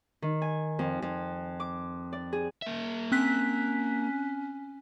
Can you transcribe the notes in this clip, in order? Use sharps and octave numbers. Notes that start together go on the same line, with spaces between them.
D#3
G#5
F2
F2
D6
D5
G#4
A#3 E5
C4 C#4 F#6 B6